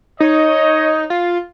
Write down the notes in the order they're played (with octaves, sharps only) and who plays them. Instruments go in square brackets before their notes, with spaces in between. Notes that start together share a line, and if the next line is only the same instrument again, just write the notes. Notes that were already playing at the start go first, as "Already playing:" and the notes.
[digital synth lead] D#4 [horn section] C#5 D#5
[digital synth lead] F4